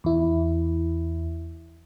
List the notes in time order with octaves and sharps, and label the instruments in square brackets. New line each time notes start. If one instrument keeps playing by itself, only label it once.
[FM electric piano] E2 E4